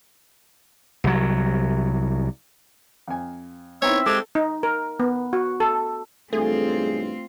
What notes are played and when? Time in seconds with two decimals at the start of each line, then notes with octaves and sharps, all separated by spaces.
1.04 C2 F#3
3.08 F2 G#5
3.82 B3 C4 D#4 E4 C#5 E5
4.06 G#3 C4 G4 A4
4.35 D#4
4.63 A#4
5.00 B3
5.33 F#4
5.60 A4
6.33 B1 E2 G2 A3 C4 F4 G#4